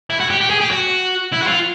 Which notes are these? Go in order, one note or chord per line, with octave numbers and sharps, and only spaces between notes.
E4
F#4
G4
G4
G#4
G4
F#4
E4
F#4
F4